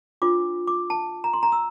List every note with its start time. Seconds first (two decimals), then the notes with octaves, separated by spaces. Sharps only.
0.22 D4 F4 C5 D6
0.67 D6
0.90 A5
1.24 A#5
1.33 C6
1.43 A#5
1.52 E6